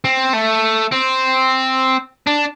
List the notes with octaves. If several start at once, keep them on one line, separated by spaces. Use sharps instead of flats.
C4
A3
C4
D4